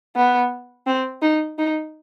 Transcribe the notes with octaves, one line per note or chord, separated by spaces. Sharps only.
B3
C4
D#4
D#4